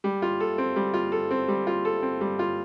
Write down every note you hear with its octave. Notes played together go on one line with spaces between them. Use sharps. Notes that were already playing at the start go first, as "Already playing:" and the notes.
G3
F4
A4
C4
G3
F4
A4
C4
G3
F4
A4
C4
G3
F4